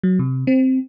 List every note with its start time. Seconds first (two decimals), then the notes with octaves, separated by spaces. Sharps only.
0.03 F#3
0.19 C3
0.47 C4